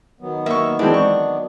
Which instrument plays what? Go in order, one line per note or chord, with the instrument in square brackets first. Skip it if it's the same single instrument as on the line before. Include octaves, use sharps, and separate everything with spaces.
[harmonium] D#3 F#3 B3
[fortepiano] A#3 C#6 [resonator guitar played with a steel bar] E5
[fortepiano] E3 G#3 C4 [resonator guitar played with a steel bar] D4
[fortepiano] C#6